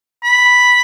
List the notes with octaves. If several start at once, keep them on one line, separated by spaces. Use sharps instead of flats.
B5